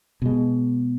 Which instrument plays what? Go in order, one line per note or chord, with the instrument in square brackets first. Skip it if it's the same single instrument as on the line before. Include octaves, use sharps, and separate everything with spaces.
[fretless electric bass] B2 G#3